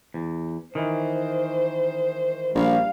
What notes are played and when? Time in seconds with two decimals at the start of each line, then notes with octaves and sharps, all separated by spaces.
0.14 E2
0.75 D#3 E3 C5
2.55 A#1 G3 F5